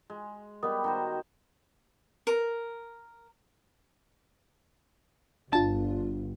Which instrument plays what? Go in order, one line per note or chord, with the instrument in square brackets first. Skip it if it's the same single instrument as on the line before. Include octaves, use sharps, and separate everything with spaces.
[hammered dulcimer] G#3
[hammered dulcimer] G3 B3 [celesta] A#4 D#5 D#6
[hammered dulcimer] D#3 F#4 C5
[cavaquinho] A#4
[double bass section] G1 [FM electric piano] D4 F4 [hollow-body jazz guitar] A5